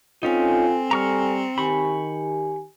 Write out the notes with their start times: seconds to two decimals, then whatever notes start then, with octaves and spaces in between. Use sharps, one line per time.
0.23 C4 C#4 D#4 F4 A4 G#5
0.91 G3 A#5 C#6 F6
1.58 D#3 G4 G#5 B5 C#6